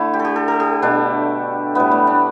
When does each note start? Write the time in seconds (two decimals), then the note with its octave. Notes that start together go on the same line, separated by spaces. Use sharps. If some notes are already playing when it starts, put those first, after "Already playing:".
Already playing: D3 A3 E4
0.13 G4
0.19 A4
0.25 G4
0.36 A4
0.48 A4
0.60 G4
0.82 B2 A3 D4
1.75 A2 G3 B3
1.91 A3
2.07 D4